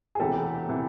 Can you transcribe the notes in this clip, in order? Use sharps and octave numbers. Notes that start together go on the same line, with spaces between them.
G#4
E1 D2 C3 E3 G4 A4
C3 E3